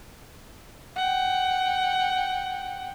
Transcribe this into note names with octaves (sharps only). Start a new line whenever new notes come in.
F#5 G5